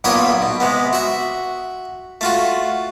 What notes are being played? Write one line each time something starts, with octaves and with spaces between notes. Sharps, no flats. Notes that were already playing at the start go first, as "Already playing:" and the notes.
B1 A#2 B3 C#5 G5 D#6
B2
C3 G#3 B3
F#4 E5
A3 F4 F#4